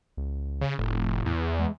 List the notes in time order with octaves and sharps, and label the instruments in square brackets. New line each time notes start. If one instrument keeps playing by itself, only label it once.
[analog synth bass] C#2
[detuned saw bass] C#3
[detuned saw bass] F1 [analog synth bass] A2
[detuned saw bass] E2
[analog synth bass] G#3